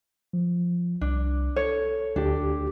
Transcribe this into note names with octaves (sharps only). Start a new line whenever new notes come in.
F3
C2 D4
A4 C#5
D2 D4 G4